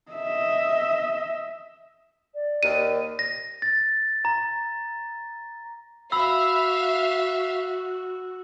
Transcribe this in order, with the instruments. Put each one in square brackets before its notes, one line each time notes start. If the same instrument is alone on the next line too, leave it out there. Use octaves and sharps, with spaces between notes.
[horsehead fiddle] D#5 E5
[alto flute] D5
[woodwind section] D#2 [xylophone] D#7
[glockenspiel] A#6
A6
A#5
[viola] F#4 [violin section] E5 F5 [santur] B5 [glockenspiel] E6